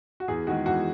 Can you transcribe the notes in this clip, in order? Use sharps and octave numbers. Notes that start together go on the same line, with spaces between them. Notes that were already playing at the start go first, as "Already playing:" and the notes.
F#4
E2 G#4
D#3 G#3 F#4
E2 F#4